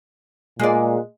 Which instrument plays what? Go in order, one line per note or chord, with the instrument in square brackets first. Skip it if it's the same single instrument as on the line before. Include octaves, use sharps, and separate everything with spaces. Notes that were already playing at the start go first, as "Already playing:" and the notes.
[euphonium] A#2 [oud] G#3 D5